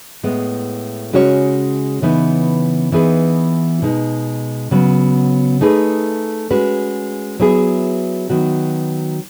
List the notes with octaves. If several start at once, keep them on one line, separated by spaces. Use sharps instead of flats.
A2 G#3 B3
C#3 G#3 C#4 F#4 C#5
C#3 E3 B3 D#4
E3 B3 D#4 G#4 B4
B2 G#3 D#4
C#3 F#3 B3
A3 D#4 G#4 B4
G#3 C#4 F#4 B4
F#3 B3 E4 G#4
D#3 F#3 B3 F#4